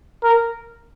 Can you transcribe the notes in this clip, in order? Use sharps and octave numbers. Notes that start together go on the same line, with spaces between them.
A#4